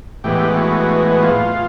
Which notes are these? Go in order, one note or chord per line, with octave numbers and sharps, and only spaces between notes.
A2 E3 G#3 B3 G4
F#4
F4